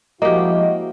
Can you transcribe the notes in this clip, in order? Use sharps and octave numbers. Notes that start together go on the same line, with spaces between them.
F3 G#3 A#3 E4 F#4 G4 D#5